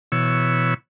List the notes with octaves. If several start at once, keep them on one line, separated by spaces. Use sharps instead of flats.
B2 E3 C#5 E6